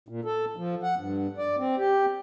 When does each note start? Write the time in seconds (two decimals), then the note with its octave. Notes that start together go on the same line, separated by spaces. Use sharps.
0.08 A#2
0.25 A4
0.56 F3
0.83 F#5
0.97 G2
1.38 D5
1.58 C4
1.77 G4